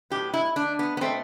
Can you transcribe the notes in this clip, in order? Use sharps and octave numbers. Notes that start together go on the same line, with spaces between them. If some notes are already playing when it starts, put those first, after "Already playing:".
A2 F#3 B3 G4
E4
D3 A3 D4
B3
B3
B2 A3 C4